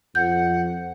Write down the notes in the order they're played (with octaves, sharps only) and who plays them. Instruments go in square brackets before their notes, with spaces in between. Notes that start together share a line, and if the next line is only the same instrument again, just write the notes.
[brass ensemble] F2 [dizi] F#5 [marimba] G6